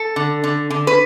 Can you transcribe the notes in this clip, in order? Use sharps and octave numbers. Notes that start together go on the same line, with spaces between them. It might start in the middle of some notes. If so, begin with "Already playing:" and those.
Already playing: A4
D3
D3
D3
B4